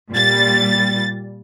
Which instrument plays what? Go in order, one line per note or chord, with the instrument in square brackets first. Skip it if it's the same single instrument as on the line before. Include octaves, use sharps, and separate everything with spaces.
[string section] A#2 G3 A6